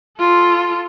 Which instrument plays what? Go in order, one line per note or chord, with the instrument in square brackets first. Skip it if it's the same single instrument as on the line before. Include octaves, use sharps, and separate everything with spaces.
[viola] F4 A4